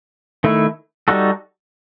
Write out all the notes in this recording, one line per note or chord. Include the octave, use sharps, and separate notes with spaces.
D#3 A3 E4
G3 D#4 F#4 A4